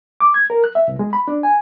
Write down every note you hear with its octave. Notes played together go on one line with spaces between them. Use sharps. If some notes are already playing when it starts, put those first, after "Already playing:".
D6
G#6
A#4
F#6
E5
C2
G#3
B5
D4
G#5